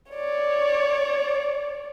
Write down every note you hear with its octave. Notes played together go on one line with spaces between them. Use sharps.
C#5 D5